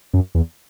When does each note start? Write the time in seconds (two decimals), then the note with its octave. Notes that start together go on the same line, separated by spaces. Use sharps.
0.13 F#2
0.35 E2